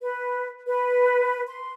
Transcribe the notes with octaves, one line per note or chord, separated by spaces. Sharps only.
B4
B4
C6